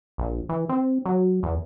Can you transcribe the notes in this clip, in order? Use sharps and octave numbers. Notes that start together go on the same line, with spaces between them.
A#1
E3
C4
F#3
E2